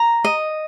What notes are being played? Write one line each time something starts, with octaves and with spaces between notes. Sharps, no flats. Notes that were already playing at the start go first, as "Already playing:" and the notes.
Already playing: A#5
D#5